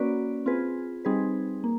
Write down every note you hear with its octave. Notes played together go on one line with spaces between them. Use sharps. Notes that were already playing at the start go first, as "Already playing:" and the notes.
Already playing: A#3 C#4 F#4 B4 D5
C4 F4 G#4 B4
G3 C4 D#4 G#4 B4
A#3